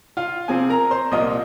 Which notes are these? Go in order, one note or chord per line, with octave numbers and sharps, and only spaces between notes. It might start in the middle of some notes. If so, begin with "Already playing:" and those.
F4 F5
C3 F3 C4 G#4 G#5
A#4 A#5
C5 C6
C2 A#2 F3 A#3 D#5 D#6